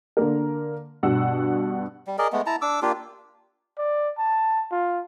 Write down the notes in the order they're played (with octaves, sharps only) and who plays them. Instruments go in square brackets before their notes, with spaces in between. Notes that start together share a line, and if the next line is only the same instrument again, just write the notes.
[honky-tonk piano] D3 A#3 A#4
G2 B2 F#5 E6
[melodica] G3
G#4 A#4 D5 D#5
G#3 A3 B3
E4 A5 A#5
D4 D6 E6
A#3 D4 F4 G4
[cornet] D5
A5
F4